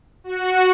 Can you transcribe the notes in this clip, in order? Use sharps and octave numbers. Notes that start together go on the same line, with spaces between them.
F#4